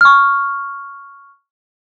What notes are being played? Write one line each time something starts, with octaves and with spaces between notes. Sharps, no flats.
C#6 F6